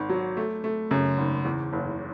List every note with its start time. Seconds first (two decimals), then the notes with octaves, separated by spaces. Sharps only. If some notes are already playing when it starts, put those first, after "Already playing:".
Already playing: G#1
0.09 F#3
0.37 A3
0.64 A3
0.91 F#2 C#3
1.18 G#1
1.45 E2
1.73 F#1